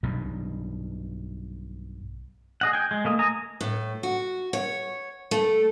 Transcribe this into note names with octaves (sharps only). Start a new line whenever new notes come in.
B1 G2 B2
G#4 D#5 F#5
G5 G#5
G#3
A3 A#3 D#5
G#5 A#5 D#6
A2
F#4
C#5
A3